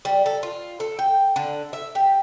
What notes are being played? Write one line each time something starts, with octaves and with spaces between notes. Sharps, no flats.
G3
A4
F4
A4
G5
D3
E5
G4